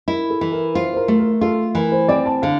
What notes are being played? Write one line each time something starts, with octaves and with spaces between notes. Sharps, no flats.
E4 A#4
A4
E3
A#4
F4 C5
C5
A#4
A3
A#4
F4 A4
E3 A#4
C5
C4 D5
A5
D3 F5